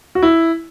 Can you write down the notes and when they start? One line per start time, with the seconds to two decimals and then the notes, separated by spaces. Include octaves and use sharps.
0.15 F#4
0.22 E4